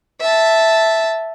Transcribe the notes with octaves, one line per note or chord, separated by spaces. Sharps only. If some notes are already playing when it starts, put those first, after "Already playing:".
E5 A5